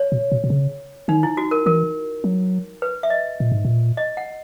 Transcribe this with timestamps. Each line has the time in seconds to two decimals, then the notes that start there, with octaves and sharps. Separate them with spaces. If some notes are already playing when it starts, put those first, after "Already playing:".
Already playing: C#5
0.12 B2
0.32 B2
0.44 B2
0.50 C#3
1.08 D#3 D#4
1.23 E4
1.37 F#4
1.51 A#4
1.66 E3 A#4
2.24 F#3
2.82 B4
3.03 E5
3.10 D#5
3.40 A#2
3.52 G#2
3.65 A#2
3.97 D#5
4.17 F#5